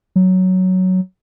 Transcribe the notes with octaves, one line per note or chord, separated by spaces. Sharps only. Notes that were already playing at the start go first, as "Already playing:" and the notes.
F#3